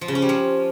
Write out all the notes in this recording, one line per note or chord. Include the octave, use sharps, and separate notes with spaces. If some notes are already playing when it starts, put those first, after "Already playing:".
F3
C#3
C#4
G3
F3